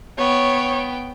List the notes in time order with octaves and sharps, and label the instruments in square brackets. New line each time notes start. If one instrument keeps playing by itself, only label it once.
[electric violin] B3 G5 [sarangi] C#5